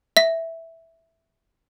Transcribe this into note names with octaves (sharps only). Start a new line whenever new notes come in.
E5 B6